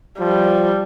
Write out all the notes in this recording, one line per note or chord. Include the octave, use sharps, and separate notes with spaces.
F3 G3